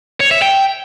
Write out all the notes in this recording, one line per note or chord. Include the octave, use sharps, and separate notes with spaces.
C#5
E5
G5